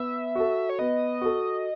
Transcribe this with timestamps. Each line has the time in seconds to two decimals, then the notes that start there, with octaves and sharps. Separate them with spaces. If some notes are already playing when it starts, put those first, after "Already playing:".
Already playing: B3 E5
0.35 F#4 A4
0.69 C#5
0.79 B3 D#5
1.21 F#4 A4